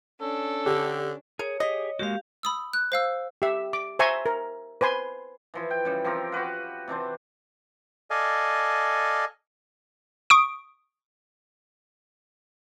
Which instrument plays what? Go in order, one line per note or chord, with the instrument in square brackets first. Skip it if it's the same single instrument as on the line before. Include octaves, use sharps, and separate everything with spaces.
[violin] C#4 D4 [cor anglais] A4
[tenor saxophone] D3 [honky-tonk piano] G4
[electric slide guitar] G#4 [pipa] A#4 [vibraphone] C#5
[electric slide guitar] G4 G#4 [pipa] D#5
[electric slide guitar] G#3 A#3 F#4 [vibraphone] G4 F5
[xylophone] B5 D#6 E6
F#6
C5 F5 E6
[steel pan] G4 E5
D6
C5 E5 G#5 A#5 C6 C#6
A#4
B4 C5 G#5 C6
[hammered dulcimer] E3 F3 E4
G5
C#3 G3
F3 C4 G4 A#4
F#4 G4 B4 F5
C3 E3 D4 C5
[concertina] A4 D5 D#5 F5 G#5
[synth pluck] C#6 D#6 D7